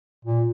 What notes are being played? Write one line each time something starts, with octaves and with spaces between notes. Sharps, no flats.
A#2